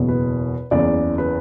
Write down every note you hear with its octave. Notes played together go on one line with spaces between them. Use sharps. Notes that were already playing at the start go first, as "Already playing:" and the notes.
Already playing: F#1 E2 B2
B4
F#1 E2 C#3 D5
B4